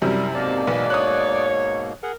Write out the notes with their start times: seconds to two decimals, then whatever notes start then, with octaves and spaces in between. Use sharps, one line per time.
0.02 F#2 C3 G3 E4 A#4
0.35 G#2 B2 A#3 G4 A#4 D5 A5
0.67 B1 E3 B3
0.90 C#5 D#6 F#6
2.03 G#4 A#4 F#5